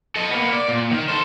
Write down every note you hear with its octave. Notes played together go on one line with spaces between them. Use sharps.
A4 D#5
A#3 B3
D5
A#2
D#3
A4 C5